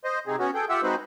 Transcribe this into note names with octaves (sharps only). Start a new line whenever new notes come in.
C5 D#5
C3 C4 D#4 G#4
B3 C#4 F#4
G#4 A4 G5
F4 G4 E5 F#5 E6
G#3 C4 D#4 F#4 B4 C5